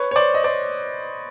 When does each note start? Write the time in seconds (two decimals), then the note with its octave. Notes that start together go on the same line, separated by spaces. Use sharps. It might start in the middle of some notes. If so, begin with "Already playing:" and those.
Already playing: B4 C#5
0.11 C#5
0.16 C5 D5
0.34 D#5
0.44 C5 D5